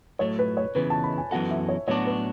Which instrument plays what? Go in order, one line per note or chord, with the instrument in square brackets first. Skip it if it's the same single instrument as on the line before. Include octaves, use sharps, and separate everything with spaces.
[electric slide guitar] A2 F#3 A3 [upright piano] C#5
[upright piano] B4
C#5
[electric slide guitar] C#3 E3 B3 [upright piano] B4
[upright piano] A5
B5
G#5
[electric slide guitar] F#2 E3 B3 F#4 A4 [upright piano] F#5
[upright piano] E5
C#5
[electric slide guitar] A2 F#3 B3 D4 F#4 [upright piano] C#5
[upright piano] B4